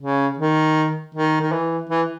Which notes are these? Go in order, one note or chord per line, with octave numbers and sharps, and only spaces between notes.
C#3
D#3
D#3
D#3
E3
E3